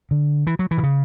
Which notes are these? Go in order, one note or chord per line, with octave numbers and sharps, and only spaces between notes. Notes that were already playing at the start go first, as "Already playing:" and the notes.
D3
E3
F#3
E3
B2
C#3